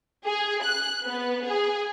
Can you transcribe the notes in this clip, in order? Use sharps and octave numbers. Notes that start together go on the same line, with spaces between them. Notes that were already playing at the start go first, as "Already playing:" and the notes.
G#4
F#6
B3
G#4